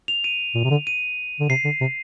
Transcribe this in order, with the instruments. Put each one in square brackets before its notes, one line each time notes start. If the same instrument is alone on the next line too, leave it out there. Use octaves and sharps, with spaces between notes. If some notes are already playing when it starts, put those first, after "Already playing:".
[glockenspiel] F7
D#7
[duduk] A#2
C3
D3
[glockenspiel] D#7
[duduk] D3
[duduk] C3 [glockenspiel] C7
[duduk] D3
C3